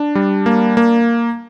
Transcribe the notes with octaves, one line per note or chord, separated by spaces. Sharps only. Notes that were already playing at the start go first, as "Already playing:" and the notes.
Already playing: D4
G3
A#3
A#3